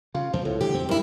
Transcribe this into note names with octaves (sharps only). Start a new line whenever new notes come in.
C#3 F4
E2 F3
C#2 A2
D3 E3 G#3 G4
F2 C4
G2 E4 A#4